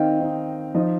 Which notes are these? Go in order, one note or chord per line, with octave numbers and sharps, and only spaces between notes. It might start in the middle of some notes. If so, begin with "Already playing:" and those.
Already playing: D#3 C4 D#4 D#5 F5 G5
D#3 C4 D#4
F3 D#4 D#5